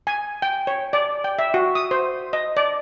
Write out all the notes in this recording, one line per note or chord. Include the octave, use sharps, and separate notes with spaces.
G#5
G5
C#5
D5
G5
E5
F#4
D#6
C5
D#5
D5